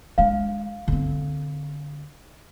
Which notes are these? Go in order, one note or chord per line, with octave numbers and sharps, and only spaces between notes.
G#3 D4 F5
D3 C4